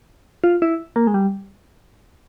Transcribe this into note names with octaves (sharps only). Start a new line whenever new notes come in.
F4
E4
A#3
G#3
G3